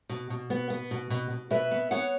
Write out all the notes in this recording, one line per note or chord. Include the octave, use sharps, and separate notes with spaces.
B2
B2
B3
B3
B2
B2
B2
B2 B4 E5
B3
B3 C#5 F#5